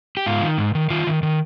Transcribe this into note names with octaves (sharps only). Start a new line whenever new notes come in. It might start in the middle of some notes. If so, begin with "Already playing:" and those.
G4
G#2 F4
D#3
G#2
D#3
D#3 F4
D#3
D#3